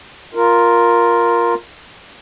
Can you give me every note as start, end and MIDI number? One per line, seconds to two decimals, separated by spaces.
0.35 1.54 65
0.35 1.54 70